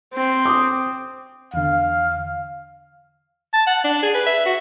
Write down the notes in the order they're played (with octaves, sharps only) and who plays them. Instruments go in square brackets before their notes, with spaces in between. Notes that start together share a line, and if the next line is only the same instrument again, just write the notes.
[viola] C4
[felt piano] D6 D#6
[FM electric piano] E2 D3 [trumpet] F5
[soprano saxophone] A5
F#5
D4
G#4
B4
E5
F#4